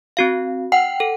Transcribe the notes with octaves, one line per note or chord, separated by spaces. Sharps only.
C4 F#4 F5
F#5 G5 C7
A4